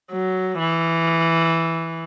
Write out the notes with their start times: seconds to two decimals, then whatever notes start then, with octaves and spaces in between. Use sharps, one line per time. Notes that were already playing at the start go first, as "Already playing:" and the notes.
0.12 F#3
0.59 E3